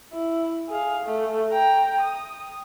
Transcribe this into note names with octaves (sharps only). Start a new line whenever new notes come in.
E4
G#4 F5
A3
G5 A#5
D#6